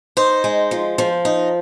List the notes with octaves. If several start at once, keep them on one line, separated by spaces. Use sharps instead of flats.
D#4 C5
G#3
F3
F3
D#4